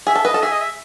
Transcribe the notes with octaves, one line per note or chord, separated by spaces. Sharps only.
G#4 E5
A4
B4 D#5
A4
G#4 E5
D#5
E5